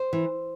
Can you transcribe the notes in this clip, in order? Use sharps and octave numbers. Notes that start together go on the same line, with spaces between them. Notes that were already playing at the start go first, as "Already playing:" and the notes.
Already playing: C5
E3